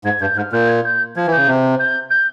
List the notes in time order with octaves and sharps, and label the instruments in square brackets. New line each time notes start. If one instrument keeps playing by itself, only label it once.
[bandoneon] G#2 [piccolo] G#6
[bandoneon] G2 [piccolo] G6
[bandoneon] G#2 [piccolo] F6
[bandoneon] A#2 [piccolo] G6
[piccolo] G#6
G6
[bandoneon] F3 [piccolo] G#6
[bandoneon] E3 [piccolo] G6
[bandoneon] C#3
C3
[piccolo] G6
G6